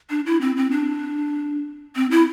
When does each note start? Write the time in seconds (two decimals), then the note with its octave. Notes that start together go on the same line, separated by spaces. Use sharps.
0.10 D4
0.26 E4
0.41 C4
0.57 C4
0.71 D4
1.96 C4
2.11 E4